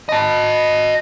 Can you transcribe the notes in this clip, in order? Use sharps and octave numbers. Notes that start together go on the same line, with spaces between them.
D#5 A5